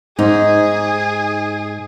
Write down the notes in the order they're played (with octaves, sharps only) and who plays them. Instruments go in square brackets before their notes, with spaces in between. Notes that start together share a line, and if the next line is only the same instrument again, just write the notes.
[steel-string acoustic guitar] G#2 [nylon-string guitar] D#4 [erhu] G#4